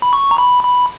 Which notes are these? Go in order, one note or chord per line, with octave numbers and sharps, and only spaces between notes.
B5
C#6
A#5
B5
B5